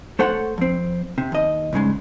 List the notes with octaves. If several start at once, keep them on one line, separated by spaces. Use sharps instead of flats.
A3 A4 C5 C#5 F#5
F2 C4
C3
D#2 D#5
C2 G#2 C#3 G#3